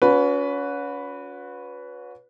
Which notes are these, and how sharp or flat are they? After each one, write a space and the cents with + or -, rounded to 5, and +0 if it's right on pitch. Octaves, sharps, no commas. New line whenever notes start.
C#4 +30 F#4 -35 B4 +0